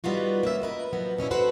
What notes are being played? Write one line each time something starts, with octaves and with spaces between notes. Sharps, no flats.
G3 B3 D#4 F4 F#4
A#3 C#4 E5
A#4 B4 D#5
F#2 B2 F3 F#3 B3
B2 C#4 D4 E4
F#4 A4 B4 C5 F#5